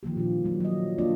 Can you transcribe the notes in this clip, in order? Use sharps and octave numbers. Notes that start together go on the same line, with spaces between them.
D#3 F3 A#3 G4
A#2 G3 D4 F4
F#3 G3
F#3 D#5
G3 A#3 D4 F4 D5